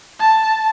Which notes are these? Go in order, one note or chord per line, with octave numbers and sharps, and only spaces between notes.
A5